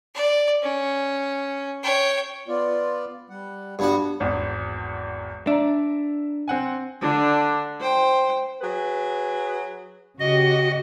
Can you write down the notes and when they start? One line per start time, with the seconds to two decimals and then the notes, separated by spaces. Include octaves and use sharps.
0.15 D5
0.62 C#4
1.83 C#5 G5
2.48 B3 F4 D5
3.30 G3 F#5
3.79 G2 B3 F#4
4.20 G#1 E2
5.47 D4 E5 A#5
6.48 C4 F#5 G#5
7.02 D3 D4
7.81 C5 G5
8.61 F#3 G#4 B4
10.20 C#3 F#4 G4 D#5